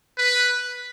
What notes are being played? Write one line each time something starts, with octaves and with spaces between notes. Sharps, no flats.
B4